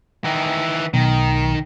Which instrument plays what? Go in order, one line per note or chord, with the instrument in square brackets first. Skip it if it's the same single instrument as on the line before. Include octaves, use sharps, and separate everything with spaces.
[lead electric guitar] D#3 E3
[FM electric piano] B1 [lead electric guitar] D#3